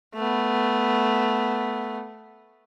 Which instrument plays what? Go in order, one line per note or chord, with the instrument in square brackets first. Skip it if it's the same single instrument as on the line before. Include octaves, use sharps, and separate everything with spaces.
[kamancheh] A3 B3